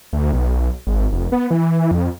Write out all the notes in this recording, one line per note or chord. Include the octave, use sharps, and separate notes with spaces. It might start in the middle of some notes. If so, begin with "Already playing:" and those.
D2
B1
G#1
F1
B3
E3
F2